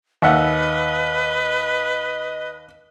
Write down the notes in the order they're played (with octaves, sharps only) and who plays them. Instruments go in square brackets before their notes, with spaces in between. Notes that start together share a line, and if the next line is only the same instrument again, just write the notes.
[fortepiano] D#2 E5 F#5 [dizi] B4 [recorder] D#5